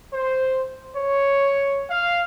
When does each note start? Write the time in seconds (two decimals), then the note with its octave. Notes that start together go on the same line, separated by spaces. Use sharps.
0.13 C5
0.96 C#5
1.89 F5